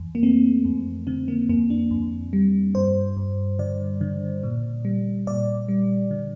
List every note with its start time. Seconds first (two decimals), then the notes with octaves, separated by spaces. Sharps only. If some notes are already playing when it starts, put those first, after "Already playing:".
Already playing: F2 E3
0.15 A#3
0.23 A3 C4
0.65 F2
1.07 D3 C4
1.28 A#3
1.49 F2 A#3
1.70 D4
1.91 F2
2.33 G3
2.75 G2 C5
3.17 G2
3.59 D3 D5
4.01 D3
4.43 A#2
4.85 G3
5.27 A#2 D5
5.68 G3
6.11 D3